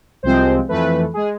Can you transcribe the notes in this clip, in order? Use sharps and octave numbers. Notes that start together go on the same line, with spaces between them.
C2 C3 F3 G#3 C4 C5
F2 E3 A3 B4
G#3 G#4